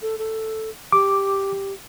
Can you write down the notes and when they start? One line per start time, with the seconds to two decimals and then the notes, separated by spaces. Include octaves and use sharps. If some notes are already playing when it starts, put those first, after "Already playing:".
0.02 A4
0.18 A4
0.92 G4 D6